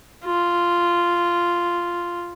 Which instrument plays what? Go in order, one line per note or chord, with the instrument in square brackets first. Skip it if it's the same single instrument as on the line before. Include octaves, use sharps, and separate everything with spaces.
[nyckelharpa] F4